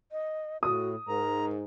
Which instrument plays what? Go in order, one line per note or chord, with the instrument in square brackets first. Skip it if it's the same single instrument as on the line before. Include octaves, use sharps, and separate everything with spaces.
[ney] D#5
[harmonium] A2 [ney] F#4 [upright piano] D#6
[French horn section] G#2 [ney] A#4 [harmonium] A#5